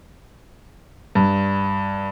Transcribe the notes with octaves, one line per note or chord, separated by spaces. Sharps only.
G2